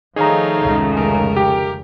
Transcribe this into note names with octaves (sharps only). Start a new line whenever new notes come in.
D#3 F3 A3 D#4 G#4 C#5 F5 A#5
F1 C#2 C#3
A#4
G4